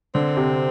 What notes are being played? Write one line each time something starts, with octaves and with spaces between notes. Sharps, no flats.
D3 C4
C3